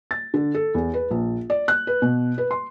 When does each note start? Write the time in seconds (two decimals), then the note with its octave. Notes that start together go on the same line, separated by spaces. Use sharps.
0.11 A6
0.34 D3
0.54 A4
0.75 E2
0.94 B4
1.11 A#1
1.50 D5
1.68 F#6
1.87 B4
2.02 B2
2.38 B4
2.51 C6